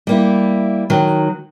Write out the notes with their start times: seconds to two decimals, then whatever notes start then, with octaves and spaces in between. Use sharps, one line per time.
0.07 G3 A#3 E4
0.90 D#3 F#3